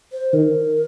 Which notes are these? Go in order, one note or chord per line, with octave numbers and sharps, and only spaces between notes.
C5
D#3 A#4